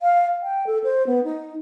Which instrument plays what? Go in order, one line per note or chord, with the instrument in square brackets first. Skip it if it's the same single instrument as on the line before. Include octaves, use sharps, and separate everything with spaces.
[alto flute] F5
G5
A4
C5
B3
D#4